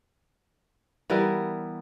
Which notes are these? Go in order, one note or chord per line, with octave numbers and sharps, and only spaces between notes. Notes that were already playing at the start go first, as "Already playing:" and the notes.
E3 G3 B3 A#4